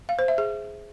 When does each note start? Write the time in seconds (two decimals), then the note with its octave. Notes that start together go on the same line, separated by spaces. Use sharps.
0.09 F5
0.19 C5
0.28 E5
0.38 G#4